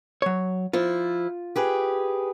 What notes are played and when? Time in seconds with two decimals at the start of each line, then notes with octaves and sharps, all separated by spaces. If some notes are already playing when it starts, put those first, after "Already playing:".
0.22 F#3 C#5
0.73 F3 E4 F4
1.56 G4 G#4 B4